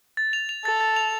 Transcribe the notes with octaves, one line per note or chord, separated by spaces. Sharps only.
A6
F7
F7
A4 A6
A6
F7